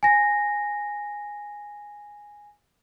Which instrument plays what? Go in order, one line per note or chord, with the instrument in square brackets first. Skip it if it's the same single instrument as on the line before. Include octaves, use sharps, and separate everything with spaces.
[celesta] G#5 A#6